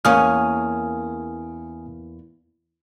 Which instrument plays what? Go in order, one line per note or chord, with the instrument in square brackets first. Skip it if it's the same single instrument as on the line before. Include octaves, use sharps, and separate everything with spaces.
[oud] E2 A#3 C#4 [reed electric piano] G#5 D#6 F6